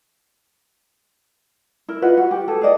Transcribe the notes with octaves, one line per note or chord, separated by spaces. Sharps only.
E4 A#4
F4 B4 D#5 F#5
F#4
G4
G#4 A4
G#4 B4 D5 D#5